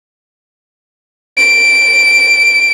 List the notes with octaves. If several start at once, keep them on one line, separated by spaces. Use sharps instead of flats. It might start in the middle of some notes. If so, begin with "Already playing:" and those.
D7